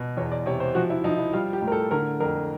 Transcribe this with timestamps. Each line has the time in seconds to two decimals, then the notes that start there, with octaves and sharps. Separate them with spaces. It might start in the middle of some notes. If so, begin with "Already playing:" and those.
Already playing: B2
0.17 E2 C#5
0.32 D5
0.46 C3 C#5
0.60 C5
0.75 F3 F#4
0.90 E4
1.04 F3 D#4
1.18 E4
1.33 G3 F4
1.53 G4
1.62 A2
1.67 A#4
1.72 A4
1.91 D3 A#4
2.20 F2 A#4